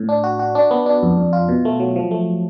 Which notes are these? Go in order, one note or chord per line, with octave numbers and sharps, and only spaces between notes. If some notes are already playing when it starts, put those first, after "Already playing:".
Already playing: A2
D4
F#4
F#4
D4
B3
D4
F2
F2
F4
B2
A3
F#3
F3
A3